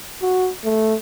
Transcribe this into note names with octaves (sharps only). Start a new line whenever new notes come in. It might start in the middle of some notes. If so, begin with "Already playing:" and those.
F#4
A3